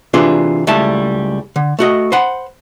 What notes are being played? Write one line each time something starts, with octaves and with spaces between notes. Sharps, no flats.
C3 E3 D4 F4 G#4
C#2 G3 A3 E4 A5
D3
A3 F#4 D#5
C5 F#5 B5